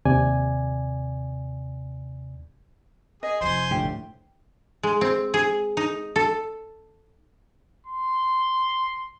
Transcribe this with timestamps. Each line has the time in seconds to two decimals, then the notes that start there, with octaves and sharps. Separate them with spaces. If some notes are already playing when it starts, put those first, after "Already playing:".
0.05 D#2 C3 D5 G#5
3.23 G#4 D#5
3.41 F1 F3 C5 G#5 C6
3.71 G1 D2 A2 G4
4.83 G#3
5.01 C4
5.34 G#4
5.77 D#4
6.16 A4
7.87 C6